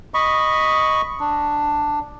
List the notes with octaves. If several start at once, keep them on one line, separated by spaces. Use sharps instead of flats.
D#5 B5 C#6
D4